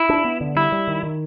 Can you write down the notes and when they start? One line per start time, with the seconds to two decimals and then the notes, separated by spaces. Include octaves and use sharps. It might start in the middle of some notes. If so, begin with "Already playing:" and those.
Already playing: E4
0.09 D4
0.25 B3
0.41 D3
0.56 G3 E4
0.72 G3
0.88 D#3
1.03 D#3